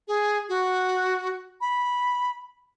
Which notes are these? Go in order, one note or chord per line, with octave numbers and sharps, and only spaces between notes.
G#4
F#4
B5